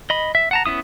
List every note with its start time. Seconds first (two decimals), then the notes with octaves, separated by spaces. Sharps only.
0.10 D#5 B5
0.35 E5
0.51 F#5 A5 A#5
0.66 B3 C#4 E4 D#6